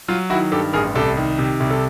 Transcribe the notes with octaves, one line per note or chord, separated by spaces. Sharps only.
F#3 F4
D#3 E4 F#4
G2 G4 A4
A1 G#4 A#4
C2 G4 A4
D#3
C3
C2
A4